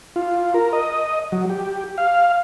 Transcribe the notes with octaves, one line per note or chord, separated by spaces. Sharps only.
F4
A#4
D#5
F#3
G4
F5